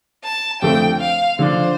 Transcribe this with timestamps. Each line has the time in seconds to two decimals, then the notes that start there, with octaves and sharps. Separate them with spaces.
0.24 A5
0.62 F2 D3 A3 C4 G5
1.00 F5
1.39 D3 F3 D4 C5